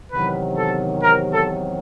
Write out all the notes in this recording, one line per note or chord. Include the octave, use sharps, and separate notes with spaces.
E2 C3 D#3 F#3 B4
A4
A#4
A4